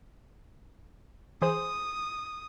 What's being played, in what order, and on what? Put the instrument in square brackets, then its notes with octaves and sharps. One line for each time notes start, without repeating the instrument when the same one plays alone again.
[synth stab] E3 G#4 C5 [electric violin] D#6